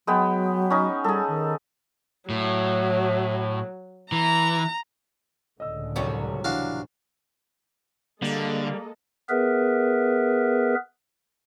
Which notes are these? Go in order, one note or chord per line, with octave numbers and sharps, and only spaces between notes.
F#3 G#3 B3 G5
C#4 D#4
G3 G#4 A4
D#3
A2 F#3
E3 A#5
C#2 A2 D3 D#5 E6
F1 C2 C3 F#3 G3
E3 D4 F#4 F5
D3 G3 G#3 A#3 A4 D#5
B3 G#4 A#4 B4 E5